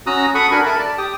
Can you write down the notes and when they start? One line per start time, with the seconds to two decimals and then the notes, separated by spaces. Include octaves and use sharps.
0.07 C#4 F#4 A#5 D#6 E6 F#6
0.35 A4 F#5 B5 C#6 D#6 F#6
0.51 D4 F#4 A#4 G#5 B5 C#6
0.66 A4 A#4 E5 A5 B5
0.79 D5 A5
0.98 G4 G5 D#6